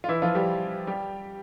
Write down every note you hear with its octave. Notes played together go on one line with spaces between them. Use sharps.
F4
E3 E4
F3 F4
G3 G4
G3 G4